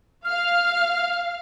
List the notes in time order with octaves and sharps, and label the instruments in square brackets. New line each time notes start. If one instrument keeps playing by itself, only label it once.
[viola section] F5 [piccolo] F6